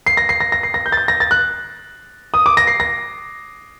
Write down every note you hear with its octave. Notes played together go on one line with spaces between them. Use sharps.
C7
A#6
C7
A#6
A#6
C7
A#6
G6
A6
G6
A#6
A6
F#6
D#6
D6
A#6
C7
A#6